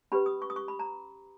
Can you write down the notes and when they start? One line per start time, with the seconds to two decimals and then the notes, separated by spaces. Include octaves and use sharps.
0.12 C#4 G4 B4 B5
0.26 D#6
0.42 C#6
0.50 D#6
0.56 C#6
0.68 B5
0.79 A#5